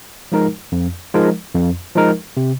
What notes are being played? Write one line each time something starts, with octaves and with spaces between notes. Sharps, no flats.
F3 G#3 D#4 A#4
F2
F3 G#3 D#4 A#4
F2
F3 G#3 D#4 A#4
C3